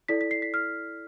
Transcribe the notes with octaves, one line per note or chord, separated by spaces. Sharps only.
E4 A4 D5 B6
B6
C7
B6
F6